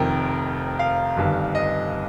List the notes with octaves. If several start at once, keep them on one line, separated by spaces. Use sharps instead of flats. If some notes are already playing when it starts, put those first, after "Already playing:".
Already playing: F1 F2 D#3 A#4 G5
F5
G1 G2 D#3
D#5